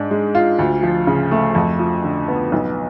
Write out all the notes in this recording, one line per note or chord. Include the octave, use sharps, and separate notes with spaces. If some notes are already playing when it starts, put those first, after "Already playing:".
Already playing: G#2 D4
G#3
F4
D2
F3
C#3
A3
F2
F3
D3
B3
B1